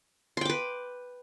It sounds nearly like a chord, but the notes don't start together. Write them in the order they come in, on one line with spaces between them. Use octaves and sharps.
C6 G5 D6 B4